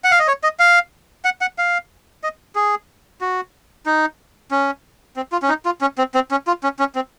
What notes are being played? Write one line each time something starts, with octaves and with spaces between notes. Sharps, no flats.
F#5
F5
D#5
C#5
D#5
F5
F#5
F#5
F5
D#5
G#4
F#4
D#4
C#4
C4
F4
C#4
D#4
F4
C#4
C4
C4
C#4
F4
C#4
C#4
C4